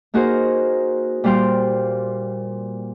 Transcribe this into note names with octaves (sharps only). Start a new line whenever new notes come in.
A#3 D#4 F#4 G#4 A#4 C5
A#2 G3 C5 F5 G5 C6